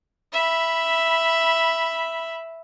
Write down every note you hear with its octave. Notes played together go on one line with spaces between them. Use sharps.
E5 B5